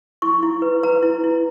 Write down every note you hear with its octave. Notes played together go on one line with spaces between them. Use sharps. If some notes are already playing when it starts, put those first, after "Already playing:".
E4 C#6
E4
B4
B4 A#5
E4
E4